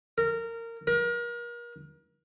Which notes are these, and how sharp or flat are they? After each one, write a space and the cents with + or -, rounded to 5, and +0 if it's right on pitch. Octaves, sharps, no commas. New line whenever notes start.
A#4 -20
A#4 +35